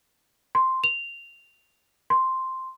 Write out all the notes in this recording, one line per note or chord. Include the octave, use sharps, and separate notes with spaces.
C6
F7
C6